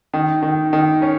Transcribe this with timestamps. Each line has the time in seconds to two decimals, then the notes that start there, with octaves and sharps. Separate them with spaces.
0.14 D#3
0.43 D#3
0.73 D#3
1.02 C#4